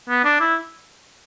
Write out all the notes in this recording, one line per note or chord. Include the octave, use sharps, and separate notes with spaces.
B3
D4
E4